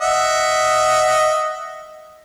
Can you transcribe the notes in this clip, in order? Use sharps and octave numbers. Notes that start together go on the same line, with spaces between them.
D#5 E5 F#5